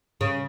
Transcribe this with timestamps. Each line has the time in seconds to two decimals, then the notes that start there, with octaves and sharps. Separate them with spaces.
0.21 C#3